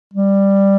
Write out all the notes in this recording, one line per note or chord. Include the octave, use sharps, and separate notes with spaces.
G3